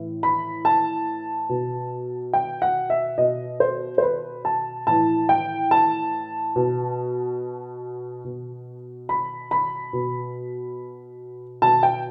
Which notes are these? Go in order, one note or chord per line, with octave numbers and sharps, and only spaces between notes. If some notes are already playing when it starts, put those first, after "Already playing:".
Already playing: A2 E3
B5
A5
B2
G5
F#5
E5
B2 D#5
C5
C5
B4
A5
A2 E3 A5
G5
A5
B2
B2
B5
B5
B2
B2 A5
G5